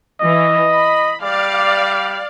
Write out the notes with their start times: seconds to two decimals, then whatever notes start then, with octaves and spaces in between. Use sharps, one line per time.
0.21 E3 D#5
0.72 B5
1.23 G3 D5 F5